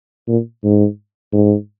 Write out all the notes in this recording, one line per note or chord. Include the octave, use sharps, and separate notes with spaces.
A#2
G#2
G#2